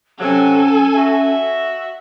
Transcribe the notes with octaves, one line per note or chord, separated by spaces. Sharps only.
C3 F#3 C#4 A4 G#5
F#4 E5